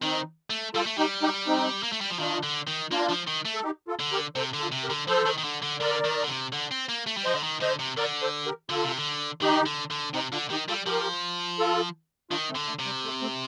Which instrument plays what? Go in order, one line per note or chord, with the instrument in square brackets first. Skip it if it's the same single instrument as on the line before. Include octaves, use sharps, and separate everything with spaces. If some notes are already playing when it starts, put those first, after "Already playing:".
[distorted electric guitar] D#3 [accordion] C4 D#4
[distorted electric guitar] A3
[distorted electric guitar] G3 [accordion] F4 A4
[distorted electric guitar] A3
[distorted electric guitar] G3 [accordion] D#4 G4
[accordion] D#4 G4
C4 D#4
[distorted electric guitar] A#3
A3
G3
F3
[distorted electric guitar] D#3 [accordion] D4 F4
[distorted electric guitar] D3
D#3
[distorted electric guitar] A#3 [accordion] D4 F4
[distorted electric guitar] F3
D#3
A3
[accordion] A4
D#4 G4
F4 A4
[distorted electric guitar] D3
[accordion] G4 A#4
[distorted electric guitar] C3 [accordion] A4 C5
[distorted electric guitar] D3
[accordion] F4 A4
[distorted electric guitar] C3
[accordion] G4 A#4
[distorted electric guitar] D3
[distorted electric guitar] F3 [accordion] A4 C5
[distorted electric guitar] D#3
D#3
D3
D3
[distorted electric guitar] D3 [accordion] A#4 D5
[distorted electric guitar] D#3
D3
C3
D3
C4
A#3
A3
G3
[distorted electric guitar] F3 [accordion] C5 D#5
[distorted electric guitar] D3
D#3
[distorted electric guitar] D3 [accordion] C5 D#5
[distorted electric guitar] C3
[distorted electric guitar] D3 [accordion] A#4 D5
[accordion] A4 C5
G4 A#4
[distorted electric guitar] D3 [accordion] F4 A4
[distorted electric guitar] C3
D3
[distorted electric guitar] D#3 [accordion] D#4 G4
[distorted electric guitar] D3
D3
[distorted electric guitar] C3 [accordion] C4 D#4
[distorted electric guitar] D3 [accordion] D4 F4
[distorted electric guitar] D#3 [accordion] D#4 G4
[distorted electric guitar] G3 [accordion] F4 A4
[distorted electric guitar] F3 [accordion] G4 A#4
[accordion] F4 A4
[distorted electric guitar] D#3 [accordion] D4 F4
[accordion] A3 C4
[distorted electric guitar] D3
[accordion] A3
[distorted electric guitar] C3
[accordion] G3
A3
A3 C4